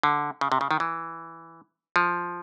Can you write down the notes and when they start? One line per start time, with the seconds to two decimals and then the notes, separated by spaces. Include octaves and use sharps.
0.03 D3
0.41 C#3
0.52 C3
0.61 C#3
0.71 D#3
0.80 E3
1.96 F3